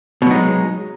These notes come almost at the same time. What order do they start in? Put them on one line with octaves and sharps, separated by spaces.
B2 F#3 D#4 G#3